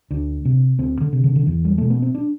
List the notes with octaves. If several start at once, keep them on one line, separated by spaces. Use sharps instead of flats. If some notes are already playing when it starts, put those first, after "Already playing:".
D2 D4
C3
D2 C4
D3
C3
D3
D3
E2 E3
G3
B2 A3
B3
C4
D4